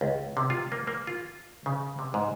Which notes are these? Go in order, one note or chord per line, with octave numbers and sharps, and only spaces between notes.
C#2
C3
F4
A#3
A#3
F4
C#3
C3
G#2